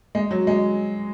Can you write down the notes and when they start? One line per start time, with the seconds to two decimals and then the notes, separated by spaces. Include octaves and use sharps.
0.15 G#3
0.31 F#3
0.47 G#3